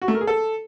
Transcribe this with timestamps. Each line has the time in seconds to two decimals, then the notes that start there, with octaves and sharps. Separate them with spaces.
0.02 F#4
0.08 A3
0.14 A#4
0.21 G#4
0.27 A4